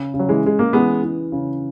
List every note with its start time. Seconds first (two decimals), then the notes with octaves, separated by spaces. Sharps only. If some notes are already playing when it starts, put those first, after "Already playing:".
Already playing: C#3
0.14 C#3
0.19 F#3
0.29 E3 G#3
0.44 C#3 G#3
0.59 A#3
0.73 E3 G#3 B3
1.03 E3
1.32 C#3